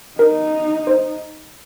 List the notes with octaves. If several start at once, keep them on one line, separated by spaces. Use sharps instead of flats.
D#4 A#4
C5